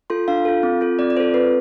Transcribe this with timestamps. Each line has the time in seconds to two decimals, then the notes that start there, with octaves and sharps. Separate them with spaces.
0.10 F4 A4 C6
0.28 D4 F5
0.45 F4 A4
0.63 C4
0.81 F4 A4
0.99 C4 D5
1.10 D5
1.16 F4 A4 C5
1.34 C4 B4